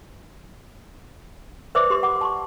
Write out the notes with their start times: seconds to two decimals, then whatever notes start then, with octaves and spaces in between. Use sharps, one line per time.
1.75 B4 C5 D5 E5 D6 D#6
1.90 G4 C6
2.03 F#5 B5 D6
2.21 A5 C6 C#6